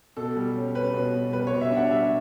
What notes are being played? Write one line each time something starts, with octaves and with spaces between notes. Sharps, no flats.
B2 A4
G3
C#4
C#4 B4
B2
B2
G3 B4
C#5
B2
E5
D4 F#5
G3 E5